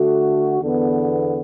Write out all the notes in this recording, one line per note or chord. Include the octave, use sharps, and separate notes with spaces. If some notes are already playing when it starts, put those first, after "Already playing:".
Already playing: D3 A3 F#4
E2 D3 B3